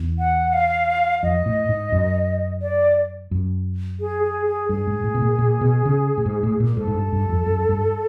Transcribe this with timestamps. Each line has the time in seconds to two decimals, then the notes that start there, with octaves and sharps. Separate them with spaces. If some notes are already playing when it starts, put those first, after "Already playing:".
Already playing: E2
0.19 F#5
0.53 F5
1.23 F2 D#5
1.46 A2
1.69 G#2
1.92 F#2
2.62 D5
3.31 F#2
4.00 G#4
4.24 G#4
4.46 G#4
4.69 G2 G#4
4.87 G#2
5.04 A2
5.15 B2
5.22 A#2
5.39 A#2
5.61 B2
5.85 C#3
6.17 A2
6.26 G#2
6.43 A2
6.60 A#2
6.77 G#2 A4
6.87 G#2
6.94 G2
7.12 G2
7.29 F2
7.46 F#2
7.69 G2